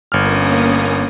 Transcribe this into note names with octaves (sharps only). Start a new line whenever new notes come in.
G1 A#3 C#4 D#6 F6